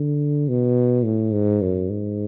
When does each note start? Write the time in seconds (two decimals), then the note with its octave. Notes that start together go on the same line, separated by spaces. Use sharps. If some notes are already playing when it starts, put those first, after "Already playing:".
Already playing: D3
0.49 B2
1.05 A2
1.33 G#2
1.62 F#2
1.90 G#2